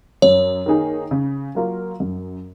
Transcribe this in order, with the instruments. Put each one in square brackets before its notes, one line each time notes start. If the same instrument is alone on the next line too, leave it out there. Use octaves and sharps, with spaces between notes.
[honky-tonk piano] F#2 [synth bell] C#5
[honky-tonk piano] D#3 A#3 D#4 G#4
C#3
F#3 A#3 F4 A#4
F#2